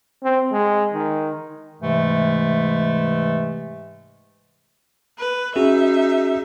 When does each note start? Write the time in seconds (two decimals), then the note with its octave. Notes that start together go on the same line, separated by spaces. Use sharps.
0.23 C4
0.52 G#3
0.94 D#3
1.82 G#2 C3 E3 G#3 A3
5.18 B4
5.56 C#4 D#4 F#4 G#4 E5